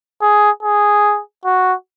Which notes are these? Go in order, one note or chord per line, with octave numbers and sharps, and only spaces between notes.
G#4
G#4
F#4